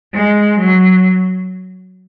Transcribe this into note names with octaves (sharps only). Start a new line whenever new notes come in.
G#3
F#3